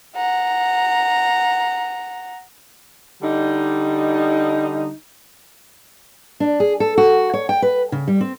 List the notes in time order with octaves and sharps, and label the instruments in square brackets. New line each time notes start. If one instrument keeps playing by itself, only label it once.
[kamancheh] F#5 A#5
[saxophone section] D3 G3 D#4
[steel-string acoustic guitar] D4
G#4
A4
F#4
C#5
G5
B4
C#3
G3
C4